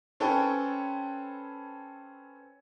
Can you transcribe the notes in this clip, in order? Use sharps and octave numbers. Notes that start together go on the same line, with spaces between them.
C4 C#4 A4 B4 G5 G#5